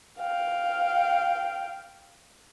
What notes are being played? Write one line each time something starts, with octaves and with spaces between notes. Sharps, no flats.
F5 G5